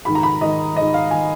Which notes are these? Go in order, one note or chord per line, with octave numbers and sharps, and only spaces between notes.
G#2 D#3 B5
A#5
B5
G#2 D#3 D#5
G#2 D#3 D#5
F5
D#3 G#5